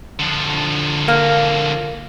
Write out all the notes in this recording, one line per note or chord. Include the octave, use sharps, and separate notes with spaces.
D3 F3
A#3